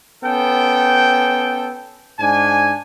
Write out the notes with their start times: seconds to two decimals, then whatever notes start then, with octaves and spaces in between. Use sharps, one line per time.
0.24 B3 C#4 A4 G5
2.19 G#2 D4 G#5